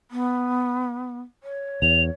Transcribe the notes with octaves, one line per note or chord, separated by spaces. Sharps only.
B3
C#5
E2 F7